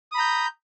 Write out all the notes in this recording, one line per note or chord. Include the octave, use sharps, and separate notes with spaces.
A#5 B5 D#6 G6